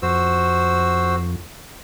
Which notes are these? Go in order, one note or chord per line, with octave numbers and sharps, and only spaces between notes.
F2 F#4 C5 E6